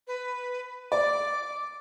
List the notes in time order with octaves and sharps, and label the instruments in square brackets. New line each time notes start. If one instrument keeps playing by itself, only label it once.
[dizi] B4
[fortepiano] D5 [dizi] D6